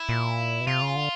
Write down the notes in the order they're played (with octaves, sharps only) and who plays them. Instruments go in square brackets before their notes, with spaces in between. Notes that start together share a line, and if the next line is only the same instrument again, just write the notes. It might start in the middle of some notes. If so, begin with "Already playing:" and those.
Already playing: [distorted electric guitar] E4
[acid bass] A#2
B2
[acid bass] C3 [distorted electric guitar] F4
[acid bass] C#3
D3